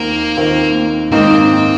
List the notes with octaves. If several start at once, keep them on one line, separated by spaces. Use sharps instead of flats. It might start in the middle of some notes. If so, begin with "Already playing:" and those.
Already playing: D#2 D#3 A#3 C4 F4
D#2 D#3 C4 F4
G#2 D#3 A#3 C4 D#4